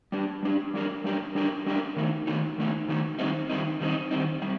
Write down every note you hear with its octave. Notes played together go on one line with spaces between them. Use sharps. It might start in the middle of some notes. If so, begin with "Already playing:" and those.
G3 D4 G4
G3 D4 G4
G3 D4 G4 A#4
G3 D4 G4 A#4
G3 D4 G4 A#4
G3 D4 G4 A#4
D#3 A3 D#4
D#3 A3 D#4
D#3 A3 D#4
D#3 A3 D#4
D#3 G3 C4 D#4
D#3 G3 C4 D#4
D#3 G3 C4 D#4
D#3 G3 C4 D#4
G3 C4